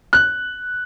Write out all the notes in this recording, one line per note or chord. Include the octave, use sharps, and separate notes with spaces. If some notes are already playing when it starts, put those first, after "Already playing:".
F#6